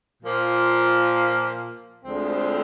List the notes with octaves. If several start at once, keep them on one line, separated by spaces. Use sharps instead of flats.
A#2 F3 A#3
D2 D3 F3 G#3 C4